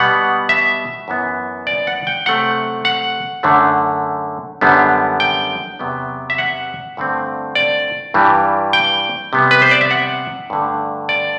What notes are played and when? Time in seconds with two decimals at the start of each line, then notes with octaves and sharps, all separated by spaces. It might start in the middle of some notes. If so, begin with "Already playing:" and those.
Already playing: B2 G3 B3 F#5
0.49 E5
1.08 F#2 E3 B3
1.67 D5
1.87 F#5
2.07 G5
2.26 C3 F#3 A3 C4 F#5
2.85 F#5
3.43 F#2 D3 A3
4.61 F#2 D3 G3 B3
5.20 G5
5.79 E2 C3 F#3 B3
6.30 E5
6.38 F#5
6.97 G2 D3 A3 C4
7.55 D5
8.14 G2 E3 G3
8.73 G5
9.33 C3 G3 B3
9.51 B4
9.62 C5
9.71 D5
9.81 E5
9.91 F#5
10.50 G2 D3 A3
11.09 D5